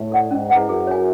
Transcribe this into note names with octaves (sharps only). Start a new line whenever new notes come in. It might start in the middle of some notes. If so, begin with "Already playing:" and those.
Already playing: A2
A4 D5 F#5
G#2 C#4
E4 G#4 B4 F#5
F#2 G#4
C#5 G#5